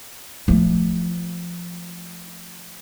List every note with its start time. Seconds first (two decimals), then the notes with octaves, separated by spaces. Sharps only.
0.48 F3 A3